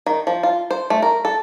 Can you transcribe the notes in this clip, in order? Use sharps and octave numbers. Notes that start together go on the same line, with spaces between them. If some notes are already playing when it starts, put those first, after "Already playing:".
D#3
F3
F4
C5
A3
A#4
A4